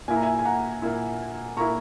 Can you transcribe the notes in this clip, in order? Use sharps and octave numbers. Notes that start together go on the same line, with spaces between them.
A#2 A#3 E4 G#5
A#5
E5 G#5
G#5
F#5 A#5
A#2 A#3 E4
A#2 A#3 E4 A#5 C#6